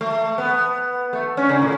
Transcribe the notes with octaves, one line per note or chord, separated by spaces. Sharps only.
A3
B3
A3
C#4
C#3
A2